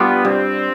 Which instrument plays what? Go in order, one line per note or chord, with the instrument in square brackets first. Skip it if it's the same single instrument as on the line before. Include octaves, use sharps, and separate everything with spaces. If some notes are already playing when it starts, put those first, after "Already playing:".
Already playing: [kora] G3 D4 F4 [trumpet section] B3
[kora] G2 [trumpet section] C4